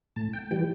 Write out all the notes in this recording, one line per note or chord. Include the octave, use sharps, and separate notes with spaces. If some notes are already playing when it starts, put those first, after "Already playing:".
A2 A5
G5
E3 G3 G5